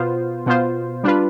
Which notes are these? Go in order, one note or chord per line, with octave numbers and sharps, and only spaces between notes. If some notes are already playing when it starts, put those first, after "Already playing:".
Already playing: B2 B3 F4 C5
B2 B3 F4 C5
G3 D4 F4 B4